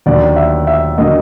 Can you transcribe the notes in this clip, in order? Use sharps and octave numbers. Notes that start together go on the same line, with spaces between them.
D#2 D3 F#3 A#3 D5
E5
E5
D3 F#3 A#3 D#5